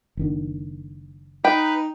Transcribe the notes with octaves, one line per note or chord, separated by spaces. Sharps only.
F#1 D#3 D4
D#4 B4 G5